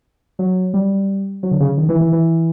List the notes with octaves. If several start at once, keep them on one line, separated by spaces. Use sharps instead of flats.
F#3
G3
F#3
D3
C#3
D#3
E3
E3
E3